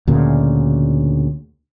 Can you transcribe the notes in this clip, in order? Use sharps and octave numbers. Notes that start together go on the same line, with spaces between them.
D2 A#2 C#3